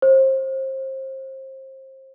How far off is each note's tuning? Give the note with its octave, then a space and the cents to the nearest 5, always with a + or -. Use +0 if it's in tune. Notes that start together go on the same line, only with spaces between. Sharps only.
C5 +30